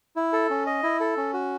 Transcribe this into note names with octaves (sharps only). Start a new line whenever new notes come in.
E4
A4
C#4
D#5
E4
A4
C#4
F#4